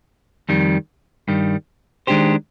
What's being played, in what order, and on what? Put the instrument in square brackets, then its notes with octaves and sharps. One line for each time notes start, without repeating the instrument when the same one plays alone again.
[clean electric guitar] F2 D#3 G3
G2 D#3 G3
D#3 G#3 D4 G4 C5